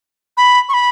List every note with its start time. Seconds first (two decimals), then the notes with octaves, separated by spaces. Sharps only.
0.37 B5
0.69 C#6
0.74 B5